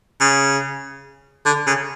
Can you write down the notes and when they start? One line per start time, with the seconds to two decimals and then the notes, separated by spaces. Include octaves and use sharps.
0.21 C#3
1.46 D3
1.67 C#3